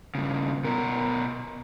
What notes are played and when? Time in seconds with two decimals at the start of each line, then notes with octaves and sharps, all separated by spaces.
0.15 G2 C#3
0.65 B2 A#4